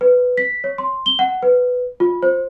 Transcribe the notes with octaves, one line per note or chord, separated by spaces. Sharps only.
B4
B6
C#5
C6
G7
F#5
B4
F4
C5